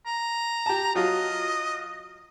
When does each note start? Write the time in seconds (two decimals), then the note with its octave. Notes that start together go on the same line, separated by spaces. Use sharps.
0.06 A#5
0.66 G4 A5
0.95 F#3 F4 D#5